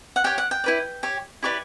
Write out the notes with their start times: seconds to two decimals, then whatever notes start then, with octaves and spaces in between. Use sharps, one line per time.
0.16 F#5
0.24 G4 C#5 G5
0.38 F#5
0.51 G5
0.64 E4 B4 D5
1.03 G4 C#5
1.43 E4 G4 B4 D5 C#6